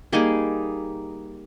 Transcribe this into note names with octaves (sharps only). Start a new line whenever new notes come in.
G3 A#3 D#4 G#4